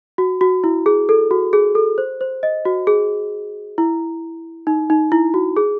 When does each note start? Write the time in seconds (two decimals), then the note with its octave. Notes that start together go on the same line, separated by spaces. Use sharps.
0.18 F#4
0.41 F#4
0.64 E4
0.86 G#4
1.09 A4
1.31 F#4
1.53 G#4
1.75 A4
1.98 C5
2.21 C5
2.43 D#5
2.65 F#4
2.87 G#4
3.78 E4
4.67 D#4
4.90 D#4
5.12 E4
5.34 F#4
5.57 G#4